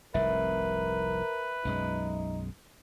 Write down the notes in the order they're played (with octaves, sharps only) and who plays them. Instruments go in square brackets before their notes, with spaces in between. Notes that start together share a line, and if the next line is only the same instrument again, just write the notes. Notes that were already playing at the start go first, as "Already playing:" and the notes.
[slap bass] F1 C2 G#2 [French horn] A#4 [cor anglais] B4 [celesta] E5
[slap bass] B1 F#2 G#3 [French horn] D#4